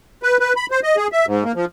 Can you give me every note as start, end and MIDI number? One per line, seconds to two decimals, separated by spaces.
0.23 0.37 71
0.40 0.53 71
0.56 0.66 83
0.71 0.80 72
0.83 0.96 75
0.97 1.07 68
1.12 1.26 76
1.27 1.44 44
1.44 1.52 58
1.55 1.65 53